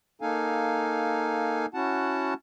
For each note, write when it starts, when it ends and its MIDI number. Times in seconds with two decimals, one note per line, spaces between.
0.22 1.66 58
0.22 1.66 63
0.22 1.66 69
0.22 1.66 77
0.22 1.66 80
1.74 2.34 61
1.74 2.34 64
1.74 2.34 66
1.74 2.34 78
1.74 2.34 81